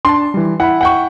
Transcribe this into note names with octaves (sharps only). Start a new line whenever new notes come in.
D4 A5 C6
E3 G3
E4 F#5 B5
F#5 G5 C#6